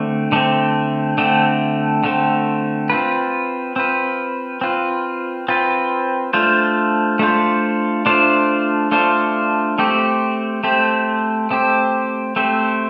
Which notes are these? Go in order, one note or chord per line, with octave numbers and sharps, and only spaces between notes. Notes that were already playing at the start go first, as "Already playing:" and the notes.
Already playing: D3 A3 C4
D3 A3 C4
D3 A3 C4
D3 A3 C4
C4 F4 B4
C4 F4 B4
C4 F4 B4
C4 F4 B4
A3 D4 F4 C5
A3 D4 F4 C5
A3 D4 F4 C5
A3 D4 F4 C5
A3 C4 G4 C5
A3 C4 G4 C5
A3 C4 G4 C5
A3 C4 G4 C5